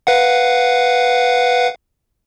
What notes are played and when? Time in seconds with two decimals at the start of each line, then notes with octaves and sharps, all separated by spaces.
0.07 B4 F5 F#5